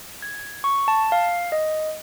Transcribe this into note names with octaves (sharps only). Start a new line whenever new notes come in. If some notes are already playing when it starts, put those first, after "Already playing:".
G#6
C#6
A5
F5
D#5